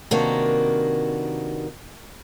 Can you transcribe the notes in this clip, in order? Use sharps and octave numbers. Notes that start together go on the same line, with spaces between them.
C3 D#3 A#3 B3 D4 F#4